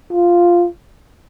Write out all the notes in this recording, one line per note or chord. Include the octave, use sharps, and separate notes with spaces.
F4